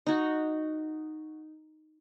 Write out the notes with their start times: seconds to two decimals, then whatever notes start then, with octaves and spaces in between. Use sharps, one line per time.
0.06 D#4 F#4